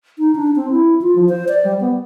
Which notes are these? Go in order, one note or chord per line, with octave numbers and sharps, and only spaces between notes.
D#4
D4
C4
E4
F4
F3
C5
D5
G3
B3